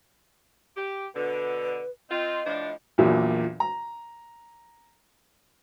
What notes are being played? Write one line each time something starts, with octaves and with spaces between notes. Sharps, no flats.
G4
B2 D3 B4
C4 F4 D#5
A2 F3 D4
A#1 E2 A#2 F#3
A#5